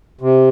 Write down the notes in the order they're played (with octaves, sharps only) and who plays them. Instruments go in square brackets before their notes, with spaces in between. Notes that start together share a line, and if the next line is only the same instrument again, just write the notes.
[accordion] C3